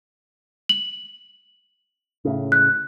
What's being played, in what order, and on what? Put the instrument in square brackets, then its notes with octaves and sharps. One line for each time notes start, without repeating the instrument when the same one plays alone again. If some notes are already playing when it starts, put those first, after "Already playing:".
[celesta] F#7
[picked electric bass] A2 C#3
[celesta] F#6